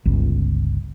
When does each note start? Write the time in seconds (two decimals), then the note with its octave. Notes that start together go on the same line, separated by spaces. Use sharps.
0.05 G1 C#2